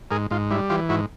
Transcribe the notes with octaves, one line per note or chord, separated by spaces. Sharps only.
G#2 G#4 A#4
G#2 F4
G3 E4
E3 F4 G4
G#2 E4 F#4